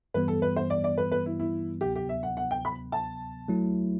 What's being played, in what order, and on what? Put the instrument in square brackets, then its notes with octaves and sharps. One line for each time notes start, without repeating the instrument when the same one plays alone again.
[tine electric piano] G2 E3 G3 B3 [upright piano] B4
[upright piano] A4
B4
C5
D5
D5
B4
B4
E4
E4
[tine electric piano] D2 C3 F#3 B3 [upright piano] G4
[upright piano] G4
E5
F#5
F#5
G5
B5
A5
[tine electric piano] F#3 A3 E4